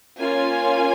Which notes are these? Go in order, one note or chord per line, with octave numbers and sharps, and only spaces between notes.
A#3 C#4 F4 G#5